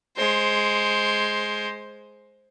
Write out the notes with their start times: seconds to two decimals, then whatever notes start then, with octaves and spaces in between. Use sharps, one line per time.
0.17 G#3 C5